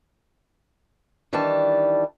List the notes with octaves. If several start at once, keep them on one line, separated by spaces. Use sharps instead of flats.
D#3 E3 G3 D4 A5